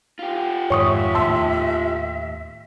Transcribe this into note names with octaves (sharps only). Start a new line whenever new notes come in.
F4 G4
F2 G#2 D#3 C#5 E5 C#6 D#6
D#2 A2 B3 A5 C6 E6